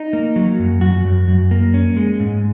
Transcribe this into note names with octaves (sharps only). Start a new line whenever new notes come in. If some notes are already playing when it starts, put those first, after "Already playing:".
Already playing: D#4
A#3
F#3
F#2
F#2 F#4
F#2
F#2
A#3
C#4
G#3
G#2